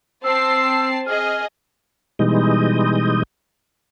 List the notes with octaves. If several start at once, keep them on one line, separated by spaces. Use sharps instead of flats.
C4 A5 E6 C7
G#4 D#5 F6
B2 E3 G3 G#3 D#4 D#5